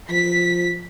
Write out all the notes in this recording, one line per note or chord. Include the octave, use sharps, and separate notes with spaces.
F3 B6